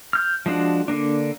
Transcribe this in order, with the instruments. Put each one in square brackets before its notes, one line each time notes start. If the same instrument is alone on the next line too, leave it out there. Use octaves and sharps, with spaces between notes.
[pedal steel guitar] F6 G6
F3 G#3 D4 F#4
D3 A#3 D4